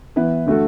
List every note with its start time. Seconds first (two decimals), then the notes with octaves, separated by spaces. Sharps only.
0.16 E3 B3 E4 B4
0.46 D3 A3 F#4 A4